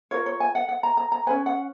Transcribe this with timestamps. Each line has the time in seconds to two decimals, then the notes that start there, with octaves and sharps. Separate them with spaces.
0.11 F4 A#4 C#5
0.26 C#5
0.40 G#5
0.55 F#5
0.69 F#5
0.83 A#5
0.97 A#5
1.12 A#5
1.27 C#4 G#4 B4 G#5
1.46 F#5